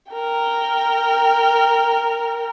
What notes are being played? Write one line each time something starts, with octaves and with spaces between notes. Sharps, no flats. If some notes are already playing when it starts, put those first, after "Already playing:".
A#4 G5